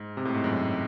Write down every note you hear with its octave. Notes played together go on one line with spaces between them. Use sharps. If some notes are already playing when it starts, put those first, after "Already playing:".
Already playing: G#2
C3
A2
G#2
F#2